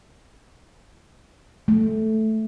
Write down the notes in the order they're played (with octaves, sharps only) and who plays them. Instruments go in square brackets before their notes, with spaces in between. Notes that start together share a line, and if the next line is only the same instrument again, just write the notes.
[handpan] A3